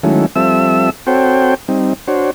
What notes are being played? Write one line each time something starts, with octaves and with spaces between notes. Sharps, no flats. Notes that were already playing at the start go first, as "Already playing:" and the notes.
D#3 F#3 G#3 A3 C#4 E4
F3 G3 C4 A4 E5 E6
C4 F#4 A4 C5 C#5 G5
G3 C4 D#4
D4 F#4 C5 C#5